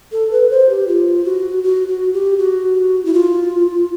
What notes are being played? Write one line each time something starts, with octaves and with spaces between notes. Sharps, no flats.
A4
B4
C5
G4
F4
F#4
F#4
F#4
G4
F#4
E4
F4